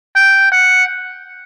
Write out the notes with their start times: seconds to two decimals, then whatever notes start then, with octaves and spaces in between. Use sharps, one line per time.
0.16 G5
0.52 F#5